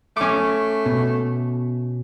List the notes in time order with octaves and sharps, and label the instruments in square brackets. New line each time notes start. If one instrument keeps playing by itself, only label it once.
[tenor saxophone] A3 [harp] C#4 D6
[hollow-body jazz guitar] B2